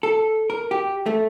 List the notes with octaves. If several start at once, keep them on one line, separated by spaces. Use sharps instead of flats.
A4
A#4
G4
A3